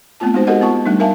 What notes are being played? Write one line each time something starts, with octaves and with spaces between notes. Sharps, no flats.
A3 B3 C4 F4 A5
G#3 D#4 F#4 C5
F#4 G4 A4 A#4 D#5 F#5
B3 F4 A5 C#6
G3 A3 D4 D#4
A#4 E5 F5 G#5 A5